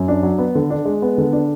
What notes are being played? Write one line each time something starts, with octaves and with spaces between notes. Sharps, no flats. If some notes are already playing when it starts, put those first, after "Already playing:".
Already playing: F#2
D4
F#3
B3
D3
D4
G#3
B3
D3
D4